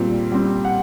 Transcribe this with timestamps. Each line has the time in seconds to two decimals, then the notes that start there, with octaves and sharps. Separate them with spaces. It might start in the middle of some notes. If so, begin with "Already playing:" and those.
Already playing: A#2 G3 C4
0.32 G3 C4
0.65 F#5